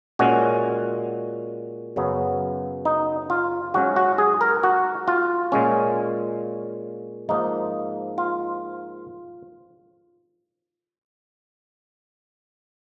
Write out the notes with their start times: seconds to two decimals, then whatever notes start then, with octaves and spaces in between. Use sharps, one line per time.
0.19 A#2 G#3 C#4 F#4
1.96 F#2 C#3 F#3 B3
2.85 D#4
3.30 F4
3.74 G#2 F#3 C#4 F#4
3.96 F#4
4.18 G#4
4.41 A#4
4.63 F#4
5.08 F4
5.52 A#2 G#3 C#4
7.29 G#2 F3 A#3 D#4
8.18 F4